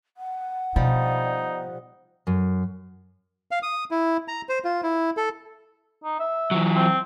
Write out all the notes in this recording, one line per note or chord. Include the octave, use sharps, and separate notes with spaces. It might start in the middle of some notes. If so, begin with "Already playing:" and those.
F#5
B2 F3 G3 D#4
F#2
F5
D#6
E4
A#5
C5
F4
E4
A4
D#4
E5
E3 F#3
C4